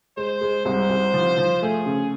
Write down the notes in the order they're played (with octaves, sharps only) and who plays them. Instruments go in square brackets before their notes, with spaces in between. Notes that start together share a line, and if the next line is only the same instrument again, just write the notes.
[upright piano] G#3 [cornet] C5
[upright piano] G#3
[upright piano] C2 [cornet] C5
[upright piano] C2
F3
F3
[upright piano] A3 [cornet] G#4
[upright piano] C#3